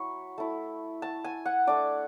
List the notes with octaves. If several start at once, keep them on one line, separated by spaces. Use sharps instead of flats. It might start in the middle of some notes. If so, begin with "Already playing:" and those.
Already playing: F#3 E4 B5 C#6
A3 E4
A5
G#5
F#5
A3 D4 D5